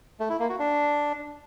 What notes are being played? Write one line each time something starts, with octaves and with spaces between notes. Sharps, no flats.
A3
E4
A#3
F#4
D4